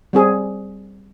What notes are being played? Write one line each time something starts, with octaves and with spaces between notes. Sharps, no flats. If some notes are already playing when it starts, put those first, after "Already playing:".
G3 C4 G#4